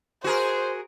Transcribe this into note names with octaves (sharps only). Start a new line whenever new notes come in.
F#4 G#4 A#4 C5